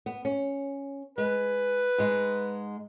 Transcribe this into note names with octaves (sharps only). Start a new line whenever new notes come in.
B3
C#4
G#3 B4
G#2 G#3